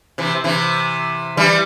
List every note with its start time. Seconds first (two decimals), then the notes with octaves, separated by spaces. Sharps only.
0.18 C3 E3
0.44 C3 E3
1.37 E3 G3